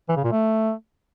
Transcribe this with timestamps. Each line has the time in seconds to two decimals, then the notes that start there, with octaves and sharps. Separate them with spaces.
0.09 E3
0.16 C#3
0.24 A#2
0.32 A3